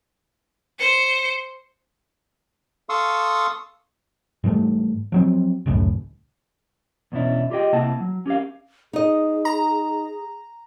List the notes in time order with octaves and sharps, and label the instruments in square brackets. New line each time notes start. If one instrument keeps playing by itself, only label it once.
[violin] C5 C#7
[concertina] A4 F5 C6 C#6 D#6 E6
[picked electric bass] G#2 E3 G3 A3
F3 F#3 C4
G#1 C#2 F#2 A2
[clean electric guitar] E2 B2 C#4 D4 E4
F4 G4 G#4 D#5 G5
C3 A#3 E4 F#5 A5
F#3
C#4 G4 G#4 A#4 F5
[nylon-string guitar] D#4 D#5 [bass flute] G#4
[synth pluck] A#5